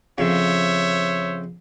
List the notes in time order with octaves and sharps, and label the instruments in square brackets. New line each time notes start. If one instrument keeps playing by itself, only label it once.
[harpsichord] F2 C#3 [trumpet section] C5 C#5 E5